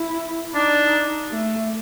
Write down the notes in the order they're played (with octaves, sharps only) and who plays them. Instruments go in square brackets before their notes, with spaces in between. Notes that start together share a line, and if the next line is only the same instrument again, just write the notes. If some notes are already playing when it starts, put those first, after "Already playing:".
Already playing: [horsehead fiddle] E4
[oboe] D4 [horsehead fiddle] D#4
[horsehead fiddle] A3